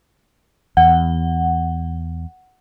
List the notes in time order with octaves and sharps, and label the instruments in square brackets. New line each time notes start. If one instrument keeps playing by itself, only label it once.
[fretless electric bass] E2 [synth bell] F#5